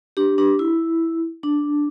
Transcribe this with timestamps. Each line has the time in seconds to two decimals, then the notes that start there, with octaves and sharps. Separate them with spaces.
0.17 D4 G4
0.38 D4 G4
0.59 E4
1.43 D4